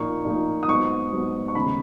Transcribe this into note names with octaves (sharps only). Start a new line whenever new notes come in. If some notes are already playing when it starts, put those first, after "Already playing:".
Already playing: A#2 F3 A#3 D#4 C#6
A#2 F3 A#3 D#4
D#6
G#2 F#3 B3 C#6
G#2 F#3 B3
C#6
D#2 C#3 G#3 B3 D#4 B5